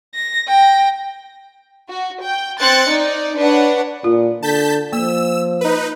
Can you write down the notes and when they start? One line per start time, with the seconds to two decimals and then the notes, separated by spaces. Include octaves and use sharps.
0.15 A#6
0.48 G5 A#6
1.89 F#4
2.22 G5
2.60 C4 F#6 A6 C#7
2.89 D#4 D5
3.37 D4 B4 C#5 F#5
4.04 A#2 F4
4.42 D3 A5 G6 B6
4.93 F3 A#3 E6
5.61 D#4 B4